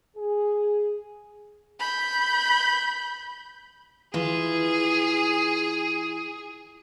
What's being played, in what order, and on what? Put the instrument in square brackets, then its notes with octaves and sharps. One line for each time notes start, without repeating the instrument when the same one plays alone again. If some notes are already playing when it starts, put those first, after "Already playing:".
[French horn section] G#4
[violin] B5 G6
[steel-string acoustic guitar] E3 F4 [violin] G#4